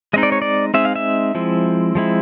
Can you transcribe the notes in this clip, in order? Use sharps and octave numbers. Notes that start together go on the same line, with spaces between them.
G#3 C4 D#4 D#5
D5
C#5
D5
G#3 C4 D#4 E5
F5
E5
F3 G#3 C4 E4
F3 G#3 C4 E4